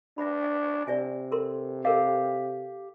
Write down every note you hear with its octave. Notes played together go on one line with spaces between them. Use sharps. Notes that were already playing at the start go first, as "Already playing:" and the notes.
D4 E5 B5
C3 D5 E5 G#5
A4 A#4 C6
G4 A4 A#4 D#5 F5